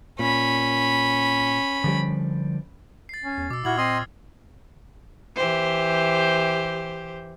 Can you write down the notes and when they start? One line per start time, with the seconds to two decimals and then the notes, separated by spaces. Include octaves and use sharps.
0.19 A#2 C#4 B5
1.84 D3 F3 G3
3.09 A6 C7
3.24 C#4
3.38 E2
3.51 B2 D6 E6
3.65 A#2 E4 F#4 F6 G#6 F#7
3.78 C4 D#5 C6 D#6
5.36 E3 G4 C5